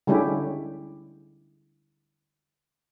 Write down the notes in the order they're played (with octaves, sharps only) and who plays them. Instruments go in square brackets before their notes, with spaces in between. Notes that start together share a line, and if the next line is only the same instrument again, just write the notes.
[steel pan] D3 G3 G#3 C#4 E4 G4